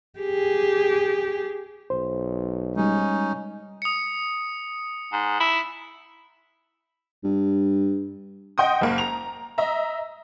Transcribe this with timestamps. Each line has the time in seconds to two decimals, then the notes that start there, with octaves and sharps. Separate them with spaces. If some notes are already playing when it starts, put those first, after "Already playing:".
0.19 G4 G#4
1.90 B1 C5
2.76 G3 G#3 C#4 D#4
3.82 D#6 C#7
5.13 G#2
5.40 E4
7.24 G2
8.58 D#5 F#5 G5 C6 D#6
8.81 F#1 A#3
8.98 A#5 F7
9.58 D#5 E5 A#5